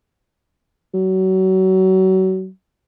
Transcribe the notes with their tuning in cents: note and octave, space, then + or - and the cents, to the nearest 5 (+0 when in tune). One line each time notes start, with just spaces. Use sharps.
F#3 +30